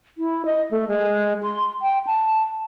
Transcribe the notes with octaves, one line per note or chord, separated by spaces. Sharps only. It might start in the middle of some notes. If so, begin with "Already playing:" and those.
E4
D#5
A3
G#3
C6
G5
A5